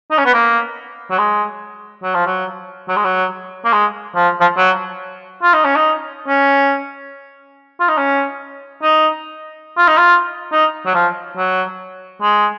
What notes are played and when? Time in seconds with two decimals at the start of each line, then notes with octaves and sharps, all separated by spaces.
0.11 D#4
0.18 C#4
0.26 B3
0.34 A#3
1.11 F#3
1.18 G#3
2.03 F#3
2.15 F3
2.26 F#3
2.89 F#3
2.96 G#3
3.05 F#3
3.65 A#3
3.73 G#3
4.16 F3
4.41 F3
4.58 F#3
5.43 F4
5.54 D#4
5.65 C#4
5.76 D#4
6.28 C#4
7.80 F4
7.89 D#4
7.97 C#4
8.82 D#4
9.77 F4
9.88 D#4
9.98 F4
10.52 D#4
10.86 F#3
10.94 F3
11.37 F#3
12.22 G#3